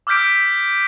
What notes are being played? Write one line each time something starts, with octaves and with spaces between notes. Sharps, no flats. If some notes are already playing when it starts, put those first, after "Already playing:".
D6 E6 F6 G6 B6 D7